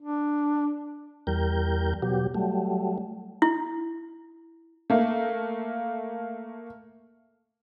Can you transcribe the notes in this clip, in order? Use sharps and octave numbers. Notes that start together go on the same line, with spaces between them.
D4
E2 G3 A#4 G6
B2 F#3 G4
F#3 G3 A3
E4
A3 A#3